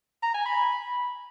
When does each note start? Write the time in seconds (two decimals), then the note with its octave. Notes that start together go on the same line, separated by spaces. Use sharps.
0.23 A#5
0.34 G#5
0.46 B5